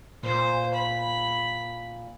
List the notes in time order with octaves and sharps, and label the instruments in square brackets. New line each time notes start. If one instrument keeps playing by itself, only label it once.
[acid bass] A#2 [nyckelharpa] C5
[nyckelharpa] B5